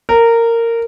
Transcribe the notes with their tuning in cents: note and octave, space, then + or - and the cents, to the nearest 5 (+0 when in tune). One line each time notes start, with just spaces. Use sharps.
A#4 -15